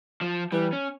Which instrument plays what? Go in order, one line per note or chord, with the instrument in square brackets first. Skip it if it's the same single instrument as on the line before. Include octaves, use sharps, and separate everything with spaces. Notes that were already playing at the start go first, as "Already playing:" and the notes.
[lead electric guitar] F3
[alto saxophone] E3 [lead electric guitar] G3
[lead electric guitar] C#4